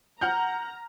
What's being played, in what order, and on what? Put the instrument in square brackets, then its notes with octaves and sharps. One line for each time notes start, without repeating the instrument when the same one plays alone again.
[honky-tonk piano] F#5 F6 G6 [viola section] A#5